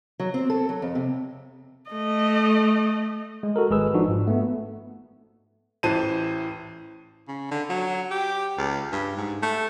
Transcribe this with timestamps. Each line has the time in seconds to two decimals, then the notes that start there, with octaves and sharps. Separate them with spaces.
0.20 F#3
0.34 C4
0.50 A4
0.69 F#3
0.82 F2
0.95 C3
1.91 A3 D#5
3.43 G#3
3.56 F#4 A4 A#4
3.70 G#1 G#3 G#4 B4 E6
3.94 F3 D4 D#4 F4 F#4
4.08 G#2
4.27 A3 B3
5.83 A1 E3 C5 A5 D#7
7.28 C#3
7.51 D3
7.70 F#3
8.11 G4
8.58 C#2
8.92 G2
9.17 G#2
9.43 A3